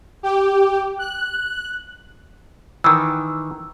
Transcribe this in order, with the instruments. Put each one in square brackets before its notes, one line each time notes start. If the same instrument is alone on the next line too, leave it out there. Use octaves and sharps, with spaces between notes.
[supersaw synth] G4
F#6
[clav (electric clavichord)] D#3 E3 [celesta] E6